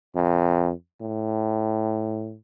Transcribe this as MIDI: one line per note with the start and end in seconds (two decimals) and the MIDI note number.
0.15 0.71 41
1.01 2.36 45